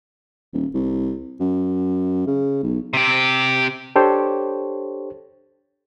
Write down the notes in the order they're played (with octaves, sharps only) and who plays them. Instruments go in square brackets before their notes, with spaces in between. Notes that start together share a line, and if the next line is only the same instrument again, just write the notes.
[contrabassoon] D#1
C2
F#2
C#3
B1
[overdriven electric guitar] C3 G4
[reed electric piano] D4 G4 A4 C5 C#5